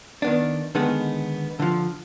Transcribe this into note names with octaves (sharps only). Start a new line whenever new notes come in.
D#3 B3 D4
D3 D#3 G#3 B3
D3 F3